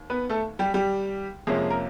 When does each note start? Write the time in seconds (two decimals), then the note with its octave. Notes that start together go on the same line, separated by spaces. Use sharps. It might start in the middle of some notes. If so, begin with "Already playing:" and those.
Already playing: D#2
0.10 B3 B4
0.29 A3 A4
0.59 G3 G4
0.74 G3 G4
1.47 F2 C3 F3 G#3 A#3 C#4 G#4
1.71 A#4